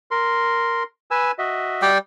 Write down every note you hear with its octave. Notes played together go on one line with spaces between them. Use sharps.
A#4 C6
B4 G#5 E6
F#4 D#5 E5
G3 D5 G5